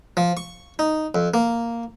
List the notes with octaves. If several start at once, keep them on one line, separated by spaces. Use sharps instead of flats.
F3
C#6
D#4
F2
A#3